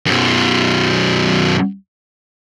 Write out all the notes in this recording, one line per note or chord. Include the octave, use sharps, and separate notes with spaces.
F#2 B2